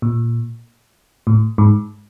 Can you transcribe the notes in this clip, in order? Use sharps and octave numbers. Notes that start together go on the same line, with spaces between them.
A#2
A2
G#2